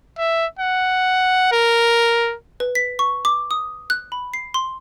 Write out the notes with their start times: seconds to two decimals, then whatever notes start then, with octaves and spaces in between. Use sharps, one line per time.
0.19 E5
0.59 F#5
1.52 A#4
2.60 B4
2.75 B6
2.99 C#6
3.25 D6
3.51 D#6
3.90 F#6
4.12 B5
4.34 C7
4.54 C6